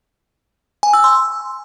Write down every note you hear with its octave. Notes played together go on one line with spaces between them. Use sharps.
G#5
E6
C6